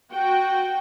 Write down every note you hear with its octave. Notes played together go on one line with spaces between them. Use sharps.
F#4 G5